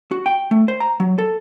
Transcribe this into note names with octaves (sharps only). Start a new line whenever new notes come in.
F#4
G5
A3
C5
A#5
F#3
A4